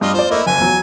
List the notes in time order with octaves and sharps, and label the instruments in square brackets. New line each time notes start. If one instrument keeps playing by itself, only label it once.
[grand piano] G2 [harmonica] G3 F4 D#5
[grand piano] F4 D5 [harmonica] C5
[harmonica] A3 A#3 E4 [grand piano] D#5
[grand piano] F#1 [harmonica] G#5
[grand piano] E2 F#3